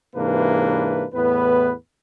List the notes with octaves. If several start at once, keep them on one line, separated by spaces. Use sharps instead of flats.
G#2 C3 E3 A#3 D4 B4
E2 A2 B3 B4